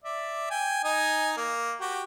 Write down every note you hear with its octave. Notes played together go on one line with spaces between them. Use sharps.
D5 E5
G5 G#5
D#4 D#5 G#5
A#3
F#4 G4 G5